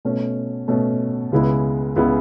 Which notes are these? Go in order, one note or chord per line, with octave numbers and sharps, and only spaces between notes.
B2 A3 C#4
B2 A3 C#4
C#2 C#3 G#3 B3 E4
C#2 C#3 G#3 B3 E4